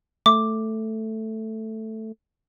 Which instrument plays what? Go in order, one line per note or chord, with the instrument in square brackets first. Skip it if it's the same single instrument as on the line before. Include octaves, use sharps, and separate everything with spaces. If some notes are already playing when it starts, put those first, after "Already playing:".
[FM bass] A3 [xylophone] D6